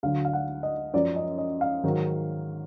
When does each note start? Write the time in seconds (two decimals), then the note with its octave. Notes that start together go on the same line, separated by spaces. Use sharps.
0.03 D2 D3 F#3 F5
0.25 F5
0.33 F#5
0.63 D#5
0.94 F#2 F3 D5
1.16 D#5
1.38 D#5
1.61 F5
1.84 G#2 D#3 F#3